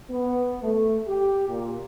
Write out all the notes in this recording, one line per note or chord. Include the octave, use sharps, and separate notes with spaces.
B3
A3
G4
A#2